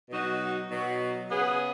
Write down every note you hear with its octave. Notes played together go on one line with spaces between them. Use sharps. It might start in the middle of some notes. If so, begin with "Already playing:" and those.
B2 F#3 D#4 F#4
B2 F#3 D#4 F#4
C#3 B3 G#4